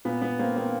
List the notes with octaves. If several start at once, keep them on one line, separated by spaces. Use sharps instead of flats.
A#2 B3
B3
A#3 C4
A#3 C4